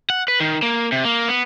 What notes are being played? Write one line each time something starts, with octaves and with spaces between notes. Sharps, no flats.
F#5
B4
D#3
A#3
C3
A#3
B3